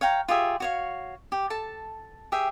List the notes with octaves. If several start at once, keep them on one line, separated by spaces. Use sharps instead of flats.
C#5 F5 G5 A#5
F4 G4 G#4 E5
F#4 C#5 F5
G4
A4 A5
G4 G#4 E5 G5